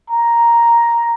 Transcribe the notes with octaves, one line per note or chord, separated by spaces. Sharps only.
A#5